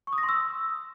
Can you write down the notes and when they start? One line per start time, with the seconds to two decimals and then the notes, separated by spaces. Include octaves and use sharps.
0.07 C#6
0.13 D#6
0.18 A#6
0.23 C6
0.29 E6